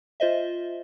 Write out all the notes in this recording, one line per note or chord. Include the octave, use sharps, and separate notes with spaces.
F4 C5 D#5 E5